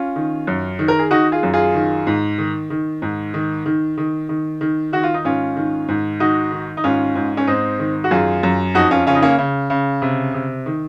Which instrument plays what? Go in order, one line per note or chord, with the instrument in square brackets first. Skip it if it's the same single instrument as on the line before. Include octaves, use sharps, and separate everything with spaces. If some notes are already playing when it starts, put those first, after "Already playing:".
Already playing: [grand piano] C#4 F4
D#3
F#2
D#3
A#4
G#4
D#3 D#4 F#4
F4 G#4
F#2
F4 G#4
D#3
G#2
D#3
D#3
G#2
D#3
D#3
D#3
D#3
D#3
D#3 F#4
F4
D#4
G#2 C#4 F4
D#3
G#2
D#3 D#4 F#4
D#3
D#4
G#2 C#4 F4
G#2
C#4
G#2 C4 D#4
D#3
F#4
F#2 F4 G#4
F#2
F2 D#4 F#4
C#4 F4
C#3 C#4 F4
D#4
A#3 C#4
C#3
C#3
C3
C3
D#3